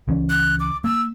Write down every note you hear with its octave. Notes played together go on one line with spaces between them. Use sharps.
C#2 E3 C#4
F#6
D6
A#3 E6